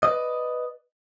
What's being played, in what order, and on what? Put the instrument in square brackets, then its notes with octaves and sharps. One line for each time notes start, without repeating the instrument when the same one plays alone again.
[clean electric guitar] B4 D5 D#5